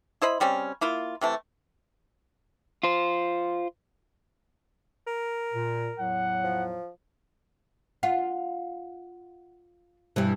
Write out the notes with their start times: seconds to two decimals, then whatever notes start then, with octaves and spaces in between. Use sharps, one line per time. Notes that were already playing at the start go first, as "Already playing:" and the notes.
0.22 E4 C5 D#5 B5
0.40 C#3 G3 C4 C#4
0.81 A#3 E4 F4
1.21 C3 E3 A3
2.83 F4 C5
5.07 A#4
5.54 A#2
5.99 E2 A2 F#3 F#5
6.44 F3
8.03 F4 F#5
10.16 G2 B2 E3 G3